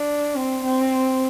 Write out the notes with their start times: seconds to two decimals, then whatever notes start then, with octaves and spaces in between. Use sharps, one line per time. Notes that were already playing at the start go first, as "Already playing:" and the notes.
Already playing: D4
0.35 C4
0.63 C4